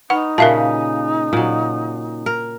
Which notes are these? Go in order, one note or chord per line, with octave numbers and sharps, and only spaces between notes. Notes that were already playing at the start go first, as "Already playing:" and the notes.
D#4 B4 F#5 B5 C#6
A#2 C#3 F#4 G4 A#4 E5 F5 A5
A#2 F#3 D#5 G#5 D#6
A#4